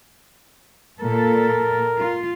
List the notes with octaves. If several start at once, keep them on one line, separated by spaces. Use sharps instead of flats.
A#2 A4 A#4
F4